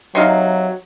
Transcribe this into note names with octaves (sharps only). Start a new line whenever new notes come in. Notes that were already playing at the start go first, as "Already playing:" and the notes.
C3 F#3 D#4 F5